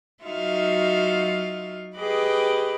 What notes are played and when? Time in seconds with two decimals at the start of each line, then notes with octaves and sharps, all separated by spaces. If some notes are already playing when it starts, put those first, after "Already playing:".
0.23 F#3 D#4 F4 F#4 E5 F5
1.96 G4 G#4 B4 D#5 B5 D6